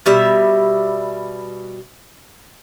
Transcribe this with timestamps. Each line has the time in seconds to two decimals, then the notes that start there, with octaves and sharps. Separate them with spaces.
0.06 B2 G3 E5